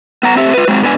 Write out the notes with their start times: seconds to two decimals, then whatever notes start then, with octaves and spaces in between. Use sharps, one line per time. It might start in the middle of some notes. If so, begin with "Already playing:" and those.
0.23 B3 F#5 A#5
0.36 A3 C4 G4 E5
0.53 F4 B4
0.67 F#3 G#3 C4
0.82 G#2 B3 D4 G#4 G#5